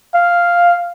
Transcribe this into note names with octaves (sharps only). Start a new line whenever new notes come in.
F5